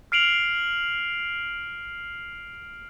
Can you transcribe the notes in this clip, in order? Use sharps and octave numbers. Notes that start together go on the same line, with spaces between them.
F6 C7 D7 F7 F#7